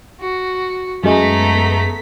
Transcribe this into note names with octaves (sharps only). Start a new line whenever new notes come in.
F#4
F#2 G#3 A3 B3 A4 A#5 B6